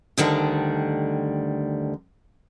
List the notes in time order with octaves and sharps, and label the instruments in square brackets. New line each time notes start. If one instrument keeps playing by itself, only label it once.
[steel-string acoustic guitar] D2 D3 D#3 G3